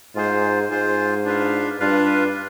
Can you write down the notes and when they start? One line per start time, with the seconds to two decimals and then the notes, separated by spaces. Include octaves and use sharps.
0.15 G#2 F4 G#4 C5
0.70 G#2 F4 G#4 C5
1.25 D4 F4 B4 F5
1.80 G2 D4 F4 B4 F5